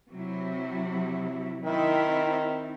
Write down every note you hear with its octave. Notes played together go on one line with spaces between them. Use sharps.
C3 F#3 E4
D#3 C4 E4